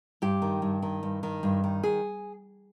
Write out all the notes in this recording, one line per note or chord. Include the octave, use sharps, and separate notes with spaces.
G2 G4
D#3
G2
D#3
G2
D#3
G2
D#3
G#4